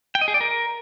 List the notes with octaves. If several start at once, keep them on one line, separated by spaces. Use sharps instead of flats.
G5
D#5
G#4
D5
A#4